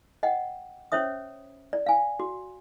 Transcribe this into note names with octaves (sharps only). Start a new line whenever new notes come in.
D#5 F#5 G5
C#4 C5 C#5 E5 D#6
D5
F5 G#5
F#4